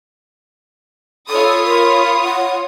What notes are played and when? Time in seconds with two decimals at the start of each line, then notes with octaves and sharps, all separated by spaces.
1.29 F4 A4 C#5 B5 D#6
1.66 A#4
2.24 F#5